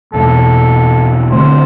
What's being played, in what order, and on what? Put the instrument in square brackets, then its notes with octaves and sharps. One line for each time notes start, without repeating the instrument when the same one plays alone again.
[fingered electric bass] E2 B2 A3 [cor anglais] A4
[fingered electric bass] D3 A3 C4 [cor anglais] C5